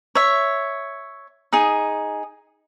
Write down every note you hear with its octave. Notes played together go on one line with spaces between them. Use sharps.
C#5 E5
D#4 G#4